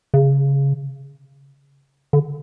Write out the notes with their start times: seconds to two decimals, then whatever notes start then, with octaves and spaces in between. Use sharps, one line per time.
0.14 C#3
2.13 D3